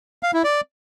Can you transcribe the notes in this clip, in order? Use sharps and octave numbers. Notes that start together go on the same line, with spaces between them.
F5
E4
D5